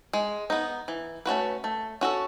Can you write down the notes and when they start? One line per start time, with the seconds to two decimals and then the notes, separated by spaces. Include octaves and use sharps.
0.13 G#3
0.50 B3 D#4
0.88 E3
1.26 A3 C#4 F#4 B4
1.64 A3
2.01 C#4 F#4 A4